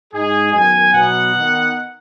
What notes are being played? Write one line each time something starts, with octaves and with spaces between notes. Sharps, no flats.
G#2 G#3 D#4 G#4
F#2 D#3 F#3 B3 G#5
B2 F#3 B3 D#4 F#5
D#3 B3 D#4